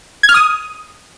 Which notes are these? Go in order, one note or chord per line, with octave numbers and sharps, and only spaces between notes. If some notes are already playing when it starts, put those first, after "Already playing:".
G#6
F6
D#6